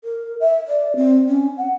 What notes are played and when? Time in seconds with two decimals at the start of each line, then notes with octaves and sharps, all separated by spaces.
0.04 A#4
0.40 E5
0.68 D5
0.96 C4
1.28 C#4
1.57 F#5